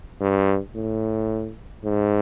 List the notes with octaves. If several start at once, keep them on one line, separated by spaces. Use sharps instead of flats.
G2
A2
G#2